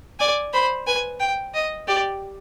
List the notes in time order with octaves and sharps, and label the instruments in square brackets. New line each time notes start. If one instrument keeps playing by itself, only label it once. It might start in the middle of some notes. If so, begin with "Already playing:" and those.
[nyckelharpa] D5 [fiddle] G#5
[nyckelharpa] C5 [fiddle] B5
[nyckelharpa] B4 [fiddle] G#5
[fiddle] G5
D#5
[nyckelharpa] G4 [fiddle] D5